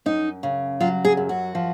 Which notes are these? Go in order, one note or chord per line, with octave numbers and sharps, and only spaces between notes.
F#2 D#4
C#3
F#3 F4
G#4
F#2
F#4
F3